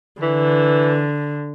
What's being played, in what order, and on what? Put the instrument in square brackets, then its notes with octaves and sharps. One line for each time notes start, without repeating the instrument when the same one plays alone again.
[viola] D3 [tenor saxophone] E3